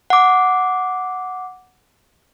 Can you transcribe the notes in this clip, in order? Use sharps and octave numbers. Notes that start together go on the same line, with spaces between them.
F#5 D6